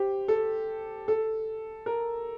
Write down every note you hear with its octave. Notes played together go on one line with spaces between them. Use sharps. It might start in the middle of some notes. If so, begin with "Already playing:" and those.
Already playing: G4 C5
A4
A4
A#4